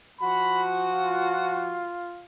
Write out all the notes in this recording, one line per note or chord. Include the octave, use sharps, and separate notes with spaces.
F3 F#4 B5
F4